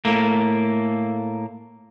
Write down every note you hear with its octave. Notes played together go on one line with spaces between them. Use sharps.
A2 A3 A#3